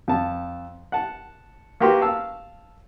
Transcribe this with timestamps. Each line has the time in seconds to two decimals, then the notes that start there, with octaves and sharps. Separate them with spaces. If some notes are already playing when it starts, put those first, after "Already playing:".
0.08 F2 A5
0.92 F#5 A5
1.80 A#3 F#4 G4 B4 C6
2.01 F5 A5 E6